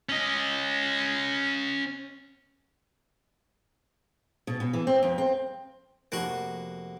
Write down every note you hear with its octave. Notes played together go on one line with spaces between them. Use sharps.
C#4 D#5
B2
B2
E3
C4
F2
C4
F1 A#3 F#4 F#6